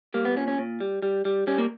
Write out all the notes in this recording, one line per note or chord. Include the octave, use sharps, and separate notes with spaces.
G3 A#3
B3
A#2 C#4
C#4
A#2
G3
G3
G3
G3 C#4
A#3